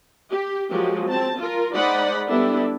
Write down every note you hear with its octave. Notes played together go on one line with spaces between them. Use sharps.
G4
F3 F#3 G#3 A#3 G4
C4 A5
F4 A#4
G#3 D#4 C5 D5 F#5 B5
G3 B3 D4 E4 G4 A4